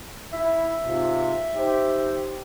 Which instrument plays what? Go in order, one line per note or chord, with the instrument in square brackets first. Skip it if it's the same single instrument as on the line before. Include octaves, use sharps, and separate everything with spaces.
[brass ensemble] E4 [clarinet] E5
[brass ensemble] G#2 C3 F4
D#4 G4 C5